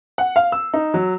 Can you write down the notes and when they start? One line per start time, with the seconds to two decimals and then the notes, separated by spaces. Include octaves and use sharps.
0.18 F#5
0.36 F5
0.52 E6
0.74 D#4
0.94 F#3